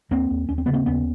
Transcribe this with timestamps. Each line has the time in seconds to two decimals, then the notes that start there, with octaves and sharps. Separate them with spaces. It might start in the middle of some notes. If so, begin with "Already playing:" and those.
0.11 D#2 A#3 C4
0.31 D#2
0.49 D#2 C#4
0.58 C4
0.66 C#3 B3
0.73 A#3 C4
0.86 D#2 B3 C#4